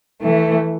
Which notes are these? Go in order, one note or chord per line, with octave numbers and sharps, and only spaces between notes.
E3 A3